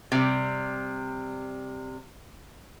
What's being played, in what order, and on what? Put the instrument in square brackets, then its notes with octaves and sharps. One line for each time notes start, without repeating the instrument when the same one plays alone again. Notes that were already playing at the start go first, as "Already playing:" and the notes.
[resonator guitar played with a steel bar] C3 G3